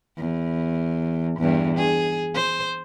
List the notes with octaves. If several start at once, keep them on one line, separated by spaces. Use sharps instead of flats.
E2
E2 G2
G#4
C5